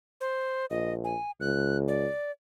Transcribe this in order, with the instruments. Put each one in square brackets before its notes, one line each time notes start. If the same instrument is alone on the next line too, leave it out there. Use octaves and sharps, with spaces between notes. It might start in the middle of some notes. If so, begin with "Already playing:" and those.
[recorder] C5
[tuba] A#1 [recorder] D#5
[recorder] G#5
[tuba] C#2 [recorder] F#6
[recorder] D5